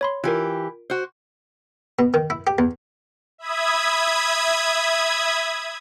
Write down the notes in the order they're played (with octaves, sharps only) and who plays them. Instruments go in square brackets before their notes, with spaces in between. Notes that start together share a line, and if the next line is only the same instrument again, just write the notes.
[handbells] C#5 B5 C6
[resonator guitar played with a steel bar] E3 G4 [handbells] F4 A#4
[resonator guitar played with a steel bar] F#4 C5
[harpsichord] B2
D#3
E4
G4
E2
[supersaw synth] E5 B5 D#6 G#6